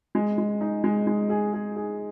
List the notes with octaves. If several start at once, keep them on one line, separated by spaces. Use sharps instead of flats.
G#3
G#3
D#4
G#3
G#3
G#4
G#4
G#4